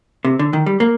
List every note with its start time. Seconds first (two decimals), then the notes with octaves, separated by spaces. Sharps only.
0.25 C3
0.39 D3
0.53 D#3
0.66 G3
0.80 A#3